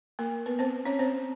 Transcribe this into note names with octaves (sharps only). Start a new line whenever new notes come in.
A#3 A#4
B3 B4
C4 C5
C#4 C#5
C4 C5